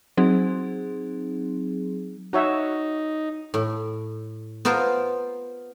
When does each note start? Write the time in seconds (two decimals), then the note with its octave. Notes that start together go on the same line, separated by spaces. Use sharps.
0.17 F#3 C4 D#4 G#4
2.33 D#4 F#4 C#5 E5
3.54 A2
4.65 B3 F4 A#4 C5